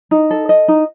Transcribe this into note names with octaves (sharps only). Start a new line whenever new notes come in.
D#4
A4
D#5
D#4